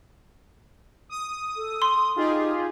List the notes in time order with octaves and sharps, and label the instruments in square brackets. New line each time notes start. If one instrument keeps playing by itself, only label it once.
[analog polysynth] D#6
[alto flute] A4
[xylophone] C6
[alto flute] D#4 [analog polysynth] F4 G4 G#4